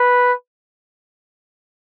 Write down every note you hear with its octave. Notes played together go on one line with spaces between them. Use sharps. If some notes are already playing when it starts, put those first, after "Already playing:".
Already playing: B4